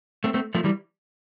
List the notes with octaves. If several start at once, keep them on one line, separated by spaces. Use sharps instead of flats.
A3 C4
A3 C4
F3 A3
E3 G3